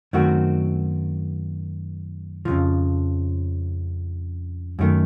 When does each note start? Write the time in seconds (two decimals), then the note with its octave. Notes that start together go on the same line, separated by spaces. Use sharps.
0.13 F#2 D#3 A3 C4 F#4
2.45 F2 C#3 F3
4.79 F#2 D#3 A3